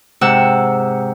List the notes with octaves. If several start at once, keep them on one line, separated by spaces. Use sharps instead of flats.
G#2 C3 F#5 E6